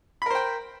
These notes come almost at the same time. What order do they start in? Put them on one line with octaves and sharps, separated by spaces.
B5 A#4 C5 G5